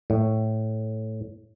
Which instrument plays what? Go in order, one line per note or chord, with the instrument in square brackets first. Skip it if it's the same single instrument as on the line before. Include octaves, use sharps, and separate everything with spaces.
[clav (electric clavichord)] A2